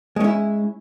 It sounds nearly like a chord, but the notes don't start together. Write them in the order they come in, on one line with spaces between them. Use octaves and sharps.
G#3 C#4 E4